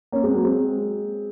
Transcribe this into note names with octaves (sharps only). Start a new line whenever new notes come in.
A#3 C#4
G#3 C4
F#3 A#3
G#3 C4